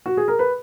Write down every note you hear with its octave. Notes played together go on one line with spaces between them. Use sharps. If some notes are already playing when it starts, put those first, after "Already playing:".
F#4
G#4
A#4
B4